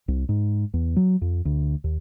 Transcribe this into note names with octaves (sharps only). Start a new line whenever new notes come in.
C2
G#2
E2
F#3
F2
D2
D#2